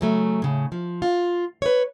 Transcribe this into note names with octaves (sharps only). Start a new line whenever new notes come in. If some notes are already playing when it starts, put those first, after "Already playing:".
C#3 F#3 A3
A2 C#3
F3
F4
B4 C#5